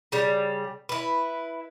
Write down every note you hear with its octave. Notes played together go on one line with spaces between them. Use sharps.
C#3 G3
E4 B4